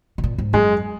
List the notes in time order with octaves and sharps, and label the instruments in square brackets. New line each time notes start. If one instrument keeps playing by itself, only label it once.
[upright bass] B2
A#2
G#2
[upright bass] F#2 [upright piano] G#3